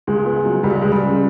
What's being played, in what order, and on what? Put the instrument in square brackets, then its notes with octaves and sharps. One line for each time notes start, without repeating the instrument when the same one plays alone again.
[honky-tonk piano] C#2 [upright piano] G#3
[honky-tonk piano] B3
F#3
[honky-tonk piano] C#2 [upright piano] G3
[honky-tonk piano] C#2 [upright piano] G#3
[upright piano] G3
[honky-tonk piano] C#3